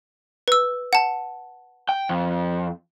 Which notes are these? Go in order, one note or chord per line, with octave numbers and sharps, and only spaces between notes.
B4 E6
F#5 A5
G5
F2